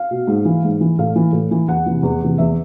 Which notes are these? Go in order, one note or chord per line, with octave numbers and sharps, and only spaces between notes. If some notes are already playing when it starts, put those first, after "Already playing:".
Already playing: F5
B2
G#2
E3
G#2
E3
A2 F5
E3
A2
E3
E2 F#5
C3 E3
E2
C3 E3
E2 E5